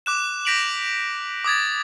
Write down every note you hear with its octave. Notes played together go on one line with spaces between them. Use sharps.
D6 F#6 E7
G6 A#6 B6 D7 F7 F#7
D6 D#6 G#6 A6